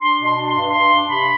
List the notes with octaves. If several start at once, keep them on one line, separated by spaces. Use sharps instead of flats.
D4 C6
B2
C6
D4
C6
G2
G2 C6
D4
C3 B5